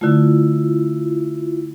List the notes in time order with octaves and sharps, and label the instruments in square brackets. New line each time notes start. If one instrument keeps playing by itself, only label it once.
[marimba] D3 A3 [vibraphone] E4 F4